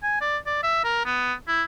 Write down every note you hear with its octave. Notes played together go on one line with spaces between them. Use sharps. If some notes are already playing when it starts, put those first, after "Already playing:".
G#5
D5
D5
E5
A#4
B3
E4